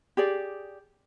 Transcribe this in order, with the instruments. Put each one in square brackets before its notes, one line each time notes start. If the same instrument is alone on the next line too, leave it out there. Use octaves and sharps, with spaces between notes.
[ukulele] G4 G#4 D5